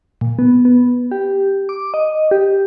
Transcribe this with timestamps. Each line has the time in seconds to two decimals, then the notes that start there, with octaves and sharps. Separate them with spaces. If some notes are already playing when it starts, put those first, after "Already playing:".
0.21 A#2
0.39 B3
0.65 B3
1.11 G4
1.69 D6
1.94 D#5
2.31 G4